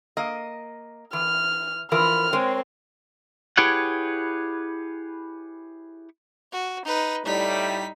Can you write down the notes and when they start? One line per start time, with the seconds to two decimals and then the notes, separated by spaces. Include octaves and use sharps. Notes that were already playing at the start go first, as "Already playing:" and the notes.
0.17 A#3 D#5
1.13 E3 F6
1.92 E3 F3 A#4 B5 F6
2.33 G#3 C4 A#4 C#5
3.57 E4 G4 G#4 B4 C#5 F#5
6.52 F#4
6.85 D#4 B4
7.25 A2 G3 D#4 B6